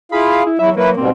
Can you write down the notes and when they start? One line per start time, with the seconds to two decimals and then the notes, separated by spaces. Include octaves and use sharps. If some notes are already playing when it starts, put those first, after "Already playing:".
0.12 E4 F4 G#4 F5 B5
0.46 E4
0.59 E2 F#3 E4 E5
0.76 F#3 A#3 E4 B4
0.97 G#2 B2 G3 C4